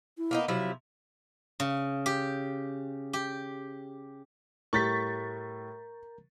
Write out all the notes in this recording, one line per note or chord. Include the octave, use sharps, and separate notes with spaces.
E4
A#3 B3 D#4
C3 F3 F#3 E4
C#3
G4
G4
A2 G3 A#4 A#5 C#6 G6 A6 B6